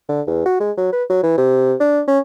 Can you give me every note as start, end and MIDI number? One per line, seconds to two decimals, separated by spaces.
0.09 0.22 50
0.27 0.45 40
0.46 0.57 66
0.60 0.72 56
0.78 0.91 54
0.93 1.04 71
1.10 1.21 54
1.24 1.35 52
1.38 1.75 48
1.80 2.02 62
2.08 2.19 61